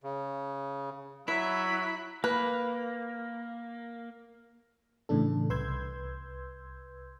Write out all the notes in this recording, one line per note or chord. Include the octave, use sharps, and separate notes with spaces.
C#3
F#3 E4 E5 B5
A#3 B4
A2 C#3 E3 D4 A4
C2 B4 C6 E6 G6 G#6